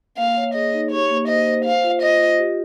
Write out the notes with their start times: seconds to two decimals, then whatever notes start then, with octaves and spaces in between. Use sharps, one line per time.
0.18 A#3 F5
0.37 C#5
0.54 G#4 D#5
0.73 D#4
0.91 G4 C#5
1.10 A#3
1.28 C5 D#5
1.46 C5
1.65 C5 F5
1.84 F4
2.02 F4 D#5
2.20 F4
2.39 G4